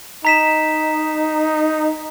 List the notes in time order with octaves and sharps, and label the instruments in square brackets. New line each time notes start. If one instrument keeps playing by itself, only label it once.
[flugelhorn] D#4 [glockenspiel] A#5 B6 E7